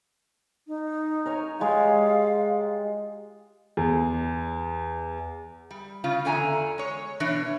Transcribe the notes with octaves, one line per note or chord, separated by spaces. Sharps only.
D#4
A#4 C#5 G#5
G#3 F4 G4 F5
E2
G3
C#3 F4
E2 D3 G#5 A#5
G#3 C#5
B2 E3 D4 C#5